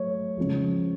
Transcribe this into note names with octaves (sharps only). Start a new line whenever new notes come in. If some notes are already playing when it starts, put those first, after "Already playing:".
Already playing: F#3 A3 C#5
C#3 F3 G#3